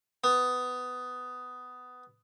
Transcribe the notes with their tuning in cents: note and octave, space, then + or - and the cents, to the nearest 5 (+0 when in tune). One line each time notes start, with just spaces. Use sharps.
B3 +15